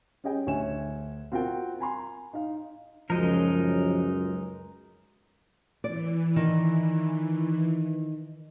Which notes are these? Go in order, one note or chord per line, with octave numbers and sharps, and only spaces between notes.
C#4 G4 G#4 D#5 G5
D2 C#5 E5 G#5 E7
C4 F4 F#4 A#4 G5
G#5 A#5 C6
D#4 F5
C#2 F#2 F3 G#3 D#4 A#4
E3 D5
D#3